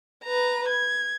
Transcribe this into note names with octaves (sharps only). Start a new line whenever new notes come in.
B4 A#5
G#6